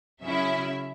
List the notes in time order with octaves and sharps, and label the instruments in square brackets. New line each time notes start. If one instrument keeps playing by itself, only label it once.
[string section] C#3 F#3 C#4 E4 E5